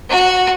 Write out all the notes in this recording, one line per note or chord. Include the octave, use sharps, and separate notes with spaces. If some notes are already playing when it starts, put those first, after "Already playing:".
F#4